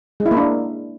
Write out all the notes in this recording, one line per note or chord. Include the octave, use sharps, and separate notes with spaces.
G#3
E4
A#3
D4